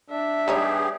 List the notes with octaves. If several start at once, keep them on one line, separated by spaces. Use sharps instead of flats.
D4 E5
G3 B3 D#4 G4 G#4 C#5